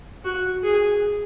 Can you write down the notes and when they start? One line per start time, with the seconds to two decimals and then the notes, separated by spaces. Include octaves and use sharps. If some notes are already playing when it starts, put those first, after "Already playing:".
0.25 F#4
0.63 G#4